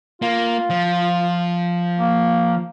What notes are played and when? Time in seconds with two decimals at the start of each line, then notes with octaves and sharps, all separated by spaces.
0.22 A#3 F4
0.70 F3
1.99 A#3